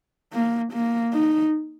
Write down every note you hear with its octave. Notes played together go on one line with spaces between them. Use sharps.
A#3
A#3
D#4